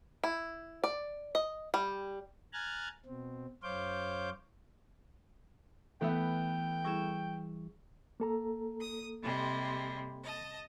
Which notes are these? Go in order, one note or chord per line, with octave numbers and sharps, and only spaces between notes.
E4
D5
D#5
G3
G#5 A#5 F6 F#6 G#6 A6
B2 C4
F#2 C5 C#5 F5 D6 G6
E3 A3 B3 B4 E5 G5
G3 E4 G#4 C#6 E7
A#3 A4 A#5
D#6
C3 G3 G#3
D#5 A5